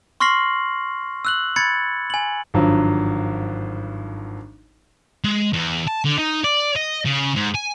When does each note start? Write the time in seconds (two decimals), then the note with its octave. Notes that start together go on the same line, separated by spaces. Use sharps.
0.20 C6 C#6 F6 A#6 C7 F#7
1.25 E6 F#6 F#7
1.56 B5 G#6 A6 C#7
2.10 G#5 F#7
2.54 G#1 G2 D3 F3 F#3
5.24 G#3
5.53 E2
5.87 A5
6.05 D3
6.18 D#4
6.44 D5
6.76 D#5
7.05 C#3
7.35 G#2
7.55 G#5